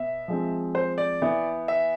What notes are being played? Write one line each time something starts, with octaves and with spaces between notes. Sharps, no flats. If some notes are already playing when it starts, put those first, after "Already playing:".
Already playing: B2 B3 E5
F3 G#3 C4
C5
D5
E3 B3 E4
E5